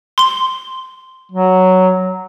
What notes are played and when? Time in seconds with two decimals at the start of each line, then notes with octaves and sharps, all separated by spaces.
0.18 C6 G7
1.32 F#3